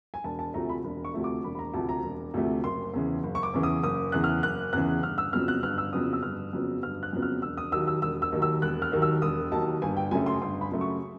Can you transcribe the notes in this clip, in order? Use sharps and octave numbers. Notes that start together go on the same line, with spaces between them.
G#5
E1 A5
A5
D2 C3 F3 A3 A#5
B5
E1
C#6
D2 C3 F3 A3
D6
E1 B5
B5
A#5
D2 C3 F3 A3 A5
A#5
E1
D2 C3 F3 A3
F#1 C6
E2 C#3 E3
F#1
C#6
D6
E2 C#3 E3
D#6
F#1 D#6
E2 C#3 E3 F#6
F6
F#1 F#6
E2 C#3 E3 F#6
G1 F6
E6
F2 C#3 F#3 B3 F6
F#6
G1 F6
E6
F2 C#3 F#3 B3 D#6
E6
G1 F6
F2 C#3 F#3 B3
G1 F6
F#6
F2 C#3 F#3 B3
F6
E1 E6
D#6
D#2 D#3 F#3 A#3 E6
E6
E1 E6
E6
D#2 D#3 F#3 A#3
E6
E1 F#6
F6
D#2 D#3 F#3 A#3
E6
E1 D#6
D#2 D#3 F#3 A#3 A5
G1 G#5
G5
F#2 C#3 F#3 A3 G#5
C6
G1 C6
B5
F#2 C#3 F#3 A3
C#6